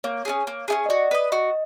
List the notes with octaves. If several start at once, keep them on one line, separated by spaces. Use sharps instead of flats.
A#3 C#5
C#4 E4 G#4
A#3
C#4 E4 G#4
D#5
F#4 D5
B4 D#5
F#4 D#5